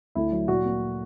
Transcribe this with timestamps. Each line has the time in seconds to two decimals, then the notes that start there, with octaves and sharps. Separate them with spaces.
0.15 D2 E4
0.32 F#3
0.48 A#2 F#4
0.65 A#3